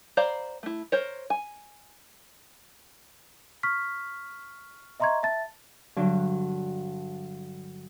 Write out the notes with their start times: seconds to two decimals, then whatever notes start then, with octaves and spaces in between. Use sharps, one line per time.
0.17 C5 D5 F5 A#5 B5
0.63 A3 E4
0.92 A#4 C5 C#5
1.30 G#5
3.63 C#6 F6 B6
5.00 D#5 E5 A#5 C6 C#6 G#6
5.23 E5 A5 A6
5.96 G2 D3 F#3 D4